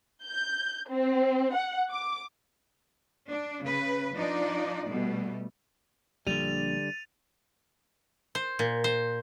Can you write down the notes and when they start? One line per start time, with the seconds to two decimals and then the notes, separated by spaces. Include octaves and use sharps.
0.25 G6
0.89 C4
1.55 F#5
1.91 D6
3.27 D4
3.62 C#3 B4
4.15 F3 D4 D#4 D5
4.87 B2 G3 A3
6.27 A#1 D3 G3 A6 D#7 F7
8.35 C5
8.59 A#2
8.84 C5